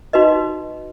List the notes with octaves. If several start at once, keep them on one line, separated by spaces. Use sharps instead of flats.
D#4 F#4 B4 D#5